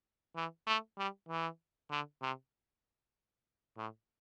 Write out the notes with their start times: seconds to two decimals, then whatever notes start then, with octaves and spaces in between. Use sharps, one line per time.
0.36 E3
0.67 A3
0.98 G3
1.29 E3
1.91 D3
2.22 C3
3.77 A2